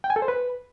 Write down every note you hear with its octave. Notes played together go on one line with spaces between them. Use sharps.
G5
G#5
A4
C5
B4